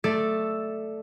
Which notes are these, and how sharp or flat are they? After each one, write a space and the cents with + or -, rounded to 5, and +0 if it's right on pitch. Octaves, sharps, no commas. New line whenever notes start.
A3 +0 A4 +0 D5 +10